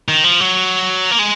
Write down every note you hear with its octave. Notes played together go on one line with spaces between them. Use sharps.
D#3
F3
F#3
A#3
G#3